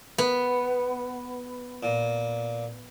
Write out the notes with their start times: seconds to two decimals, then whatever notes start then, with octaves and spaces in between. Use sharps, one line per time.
0.18 B3
1.83 A#2